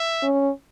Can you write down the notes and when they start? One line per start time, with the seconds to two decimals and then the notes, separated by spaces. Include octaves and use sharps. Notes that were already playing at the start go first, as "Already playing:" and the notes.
Already playing: E5
0.23 C#4